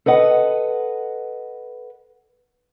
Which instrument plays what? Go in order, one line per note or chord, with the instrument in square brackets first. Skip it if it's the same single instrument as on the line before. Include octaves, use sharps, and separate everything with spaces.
[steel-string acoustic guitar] A4 B4 D#5 F#5